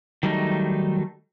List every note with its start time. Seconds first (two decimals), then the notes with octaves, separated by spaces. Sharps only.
0.23 D#3 F#3 G3 A3 D#4